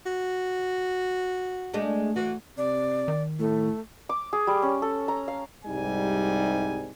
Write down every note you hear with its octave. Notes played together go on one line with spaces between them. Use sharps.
F#4
G#3 A3 D4
E3 F#4
C3 D5
D#3
A2 A3
D6
G#4
G3
C#4
A4
A#5
F5
C2 G#2 C3 G3 D#4 G#5